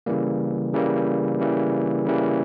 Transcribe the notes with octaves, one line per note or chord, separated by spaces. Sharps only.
C#3 E3 G3 A#3
C#3 E3 G3 A#3
C#3 E3 G3 A#3
C#3 E3 G3 A#3